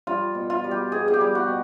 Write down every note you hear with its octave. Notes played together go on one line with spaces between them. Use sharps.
G3 F4
B2
F4
G3
G4
B2 G#4
G#4
G4
G3
F#4
B2